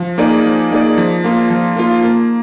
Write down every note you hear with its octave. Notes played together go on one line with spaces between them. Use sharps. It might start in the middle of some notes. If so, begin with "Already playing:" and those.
Already playing: F3
A#3 D#4 G#4 D5
F3
A#3 D#4 G#4 D5
F3
A#3 F4
F3
A#3 F4
A#3